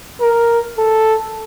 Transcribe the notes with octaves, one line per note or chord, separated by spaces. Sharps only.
A#4
A4